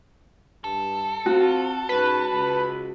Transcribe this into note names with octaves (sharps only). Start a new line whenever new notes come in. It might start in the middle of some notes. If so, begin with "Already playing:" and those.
G2 A4
C4 F4 F#4
G#2 C#4 B4
C#2